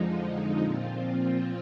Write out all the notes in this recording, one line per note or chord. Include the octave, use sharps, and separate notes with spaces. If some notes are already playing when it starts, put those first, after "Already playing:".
Already playing: F2 D3 F3 G#3 D#4
A#2 F3 C4 F4